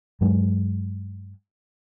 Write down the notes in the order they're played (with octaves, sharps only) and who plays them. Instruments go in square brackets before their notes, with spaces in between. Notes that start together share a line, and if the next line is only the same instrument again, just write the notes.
[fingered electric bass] G2 F#3 G#3